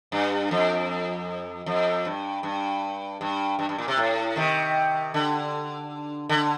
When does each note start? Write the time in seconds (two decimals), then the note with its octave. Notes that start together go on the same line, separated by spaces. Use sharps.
0.12 G2
0.51 F2
1.66 F2
2.05 G2
2.43 G2
3.21 G2
3.59 G2
3.69 G2
3.78 A#2
3.88 C3
3.97 A2
4.36 C3 D#3
5.14 D3
6.29 D3